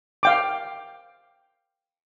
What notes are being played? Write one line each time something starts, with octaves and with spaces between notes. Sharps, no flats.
F5 G5 D6